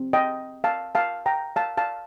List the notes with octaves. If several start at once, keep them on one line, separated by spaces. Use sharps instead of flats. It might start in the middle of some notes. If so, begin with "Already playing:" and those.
Already playing: C4
D#5 G5
F5 A5
F5 A5
G5 A#5
F5 A5
F5 A5